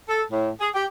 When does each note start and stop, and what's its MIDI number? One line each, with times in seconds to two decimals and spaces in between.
0.09 0.23 69
0.32 0.50 45
0.61 0.69 68
0.75 0.86 67